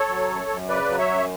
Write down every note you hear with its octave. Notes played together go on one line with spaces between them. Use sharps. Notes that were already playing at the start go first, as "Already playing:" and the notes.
Already playing: A4 C#5
F#3
F#2
F#2
C#3 B4 D5
F#3
C#5 E5
F#2